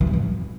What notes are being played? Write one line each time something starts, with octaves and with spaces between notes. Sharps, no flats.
E3
G3
G#2
G2